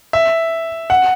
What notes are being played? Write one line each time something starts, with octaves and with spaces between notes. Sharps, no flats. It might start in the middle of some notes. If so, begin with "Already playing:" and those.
E5
F#5